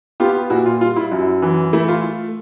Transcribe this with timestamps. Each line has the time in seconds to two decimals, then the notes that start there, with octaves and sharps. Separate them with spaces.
0.20 B3 F4 G4
0.50 A#2 E4 F#4
0.66 F4
0.81 G3 F4
0.96 E4
1.12 F#2
1.42 E3
1.73 A3 E4
1.88 F4